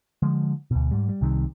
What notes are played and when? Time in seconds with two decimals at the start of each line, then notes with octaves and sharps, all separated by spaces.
0.22 D3 F3 G#3
0.71 D2 B2
0.91 G#2 G3
1.09 G3
1.21 C2 C3 D#3 G3